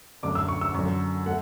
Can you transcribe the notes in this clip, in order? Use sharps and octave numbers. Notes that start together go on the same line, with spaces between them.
F#2 D3 A3 D4 D6
E6
C#6
E6
F#2 D3 F#3 C#6
A3 F#5